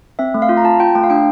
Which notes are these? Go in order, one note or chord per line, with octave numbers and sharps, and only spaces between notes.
C4 E5
A3
F5
F4
A#5
F4 A5
F4 G5
A3 G5
F5
D4 G5